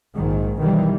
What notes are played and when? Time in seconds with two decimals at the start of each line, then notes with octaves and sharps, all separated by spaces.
0.17 A#1 G#2 D#3
0.60 B1 D#3 E3 G3